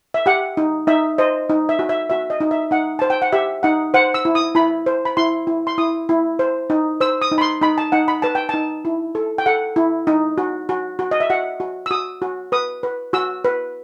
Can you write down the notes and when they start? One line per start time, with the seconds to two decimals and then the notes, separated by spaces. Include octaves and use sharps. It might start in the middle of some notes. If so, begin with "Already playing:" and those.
0.14 E5
0.26 G4 F#5
0.57 D#4
0.87 D#4 E5
1.18 C5 D#5
1.50 D#4
1.69 E5
1.79 F#4
1.89 E5
2.10 F#4 E5
2.30 D#5
2.40 D#4
2.51 E5
2.71 D#4 F#5
2.99 C5 A5
3.10 G5
3.22 F#5
3.32 G4 E5
3.63 D#4 F#5
3.94 C5 F#5
4.14 E6
4.25 E4
4.35 D#6
4.55 E4 B5
4.86 C5
5.05 B5
5.17 E4 C6
5.47 E4
5.67 C6
5.78 E4 D#6
6.09 E4
6.39 C5
6.70 D#4
7.01 C5 E6
7.22 D#6
7.31 D#4
7.38 B5
7.41 C6
7.62 D#4 B5
7.78 A5
7.92 D#4 F#5
8.08 B5
8.22 B4 A5
8.35 G5
8.49 D#4 A5
8.85 E4
9.15 A4
9.38 G5
9.46 A4 F#5
9.76 E4
10.07 D#4
10.38 F#4
10.69 F#4
10.99 F#4
11.11 D#5
11.20 E5
11.30 F#4 F#5
11.60 F#4
11.86 E6
11.91 F#4 D#6
12.22 F#4
12.52 B4 D#6
12.83 B4
13.13 F#4 E6
13.45 B4